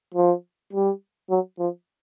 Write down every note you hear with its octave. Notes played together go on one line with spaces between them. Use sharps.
F3
G3
F#3
F3